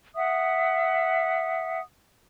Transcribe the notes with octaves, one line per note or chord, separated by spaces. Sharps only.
E5 F#5 D#6